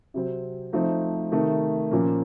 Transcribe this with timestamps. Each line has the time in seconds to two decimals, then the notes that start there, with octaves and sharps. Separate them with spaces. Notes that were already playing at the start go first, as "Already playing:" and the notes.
0.14 C3 F#3 C4
0.73 F3 A3 C4 D#4
1.32 C3 D#3 A3 D#4
1.91 A#2 F3 A#3 C#4